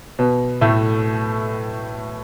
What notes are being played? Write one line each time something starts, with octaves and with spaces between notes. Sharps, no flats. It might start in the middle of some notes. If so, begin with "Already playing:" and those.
B2 B3
A2 A3